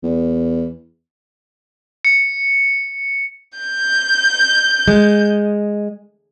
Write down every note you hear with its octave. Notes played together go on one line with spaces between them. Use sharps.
E2
C#7
G6
G#3